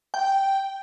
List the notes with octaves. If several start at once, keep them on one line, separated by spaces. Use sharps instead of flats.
G5